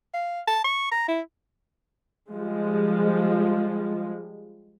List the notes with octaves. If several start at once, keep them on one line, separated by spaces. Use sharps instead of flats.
F5
A5
C#6
A#5
E4
F3 G3 G#3